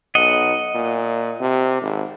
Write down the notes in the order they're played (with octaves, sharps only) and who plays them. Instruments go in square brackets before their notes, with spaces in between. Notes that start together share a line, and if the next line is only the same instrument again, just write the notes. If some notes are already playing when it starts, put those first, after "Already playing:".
[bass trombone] B1 [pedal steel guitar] D#5 F#5
[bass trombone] A#2
C3
G#1